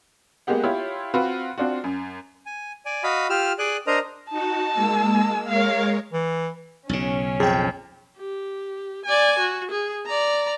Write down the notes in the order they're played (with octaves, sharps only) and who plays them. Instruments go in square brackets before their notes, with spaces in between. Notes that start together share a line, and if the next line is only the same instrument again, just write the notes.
[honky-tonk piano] G#3 A#3 B3 G4 F#5
E4 F4 G4 C#5
C4 F4 F#4 B4
C4 D4 F4 F#4
F#2
[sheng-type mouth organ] G#5
D5 G#5
F#4 D#5 F5 B5
F4 G4 E6 F6
G#4 D5 G#5 F#6
D4 A#4 C5 D#5 A#5
[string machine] D#4 F#4 [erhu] A5
[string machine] G#3 A#3 E6
[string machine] G#3 A#4 C#5 [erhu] F5
[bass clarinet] E3
[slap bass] B1 C#3 [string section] C#4
[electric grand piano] F2 [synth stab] G#4 G5
[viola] G4
D5 G#5
F#4
G#4
D5 A#5